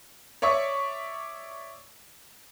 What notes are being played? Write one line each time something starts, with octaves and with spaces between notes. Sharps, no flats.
C#5 D5 E5 C#6 D#6